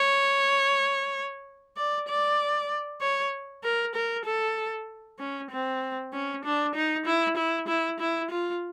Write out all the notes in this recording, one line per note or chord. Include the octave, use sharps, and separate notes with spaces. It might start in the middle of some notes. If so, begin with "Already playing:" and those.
Already playing: C#5
D5
D5
C#5
A#4
A#4
A4
C#4
C4
C#4
D4
D#4
E4
E4
E4
E4
F4